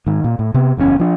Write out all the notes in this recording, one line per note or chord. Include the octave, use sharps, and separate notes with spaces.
G#2 D#3
A#2
A2
C3 B3
F#1 E2 C3 C#4
F3 D4